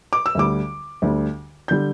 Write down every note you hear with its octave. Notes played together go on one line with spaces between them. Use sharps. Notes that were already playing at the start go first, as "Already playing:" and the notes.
D6
E6
D2 D3 G3 D6
D2 D3 G3
D3 G3 G6